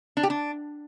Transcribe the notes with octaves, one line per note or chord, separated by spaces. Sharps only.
D4
G4
D4